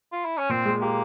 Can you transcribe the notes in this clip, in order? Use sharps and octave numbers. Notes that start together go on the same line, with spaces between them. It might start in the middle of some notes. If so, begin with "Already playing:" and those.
F4
E4
C#4
A#2 C4
G#3
A#3 G4